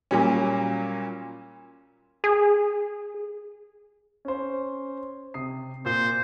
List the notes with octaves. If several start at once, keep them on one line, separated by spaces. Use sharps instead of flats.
A#2 F#3 G3 C#4
G#4
C#4 C5
C3 D#6 C7
A#2 C5